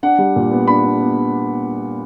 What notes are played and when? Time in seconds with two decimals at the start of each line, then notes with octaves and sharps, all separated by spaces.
0.03 D4 F#5
0.18 G3
0.36 A#2
0.51 B3
0.67 D4 B5
0.84 D4
1.01 B3